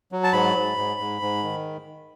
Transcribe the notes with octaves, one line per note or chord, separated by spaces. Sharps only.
F#3
A5
G#2 B5
G#2
G#2
G#2
G#2
D#3